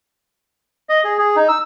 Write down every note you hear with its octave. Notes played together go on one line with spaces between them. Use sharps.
D#5
G#4
G#4
D#4
E6